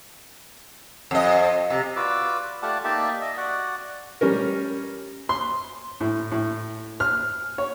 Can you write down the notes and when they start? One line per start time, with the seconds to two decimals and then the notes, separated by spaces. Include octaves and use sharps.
1.11 F2 D#5
1.70 C3
1.96 F4 F#4 B4 D5 D6 E6
2.62 A3 F4 G4 D5 F#5 A5
2.84 A#3 D#4 G4 D5 E5 A5
3.21 D#5 E5
3.37 F#4 D5 F#5
4.21 G3 C#4 A#4
5.29 C6
6.00 A2
6.31 A2
7.00 F6
7.58 C#5